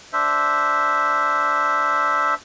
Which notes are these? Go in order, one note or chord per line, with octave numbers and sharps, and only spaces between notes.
D4 C5 E5